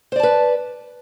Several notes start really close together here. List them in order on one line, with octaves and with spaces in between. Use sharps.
C5 D5 A5 B4